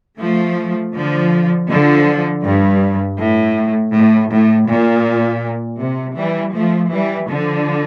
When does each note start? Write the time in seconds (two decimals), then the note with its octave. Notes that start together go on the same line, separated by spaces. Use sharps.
0.19 F3 A3
0.94 D3 F3
1.69 D3 F3
2.43 G2
3.19 A2
3.93 A2
4.30 A2
4.67 A#2
5.79 C3
6.17 E3 G3
6.54 F3 A3
6.91 E3 G3
7.29 D3 F3